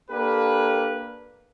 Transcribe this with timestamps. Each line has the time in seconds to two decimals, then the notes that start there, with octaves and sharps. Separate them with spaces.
0.10 A#3 D4 G4 A4 B4